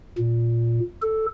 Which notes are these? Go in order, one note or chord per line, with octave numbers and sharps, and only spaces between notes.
A#2
A4